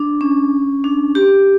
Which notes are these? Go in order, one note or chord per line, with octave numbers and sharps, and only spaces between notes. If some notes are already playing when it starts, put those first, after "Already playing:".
Already playing: D4
C#4
D4
G4